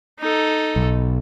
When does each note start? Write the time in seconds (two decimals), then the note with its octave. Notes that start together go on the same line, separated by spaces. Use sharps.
0.20 D#4 A4
0.76 B1